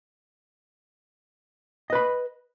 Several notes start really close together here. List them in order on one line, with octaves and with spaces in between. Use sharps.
D#5 B4 B5